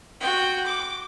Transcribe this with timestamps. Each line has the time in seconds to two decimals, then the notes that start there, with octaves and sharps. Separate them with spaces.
0.20 F#4 G5
0.66 D6